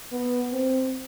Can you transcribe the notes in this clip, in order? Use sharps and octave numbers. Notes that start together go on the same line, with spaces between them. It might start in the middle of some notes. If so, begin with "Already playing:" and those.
B3
C4